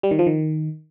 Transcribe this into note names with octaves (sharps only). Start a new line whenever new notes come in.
G3
D#3
F3
D#3